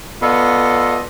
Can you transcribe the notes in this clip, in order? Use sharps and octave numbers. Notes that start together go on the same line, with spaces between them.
B3 F4 A4 D5 D#5